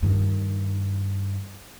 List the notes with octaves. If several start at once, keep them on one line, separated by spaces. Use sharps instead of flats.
G2 D#3